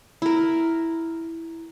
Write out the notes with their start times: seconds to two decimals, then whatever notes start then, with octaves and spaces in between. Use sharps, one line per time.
0.22 E4 A#4